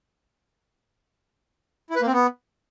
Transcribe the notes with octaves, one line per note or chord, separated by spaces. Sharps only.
E4
B4
A#3
C4
B3